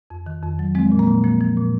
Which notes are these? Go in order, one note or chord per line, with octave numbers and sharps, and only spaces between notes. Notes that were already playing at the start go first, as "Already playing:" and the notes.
F2
D#3
F2
F#3
F3 G#3 C4
A#2
A#3
A#2
F3 A#3
F3
A#2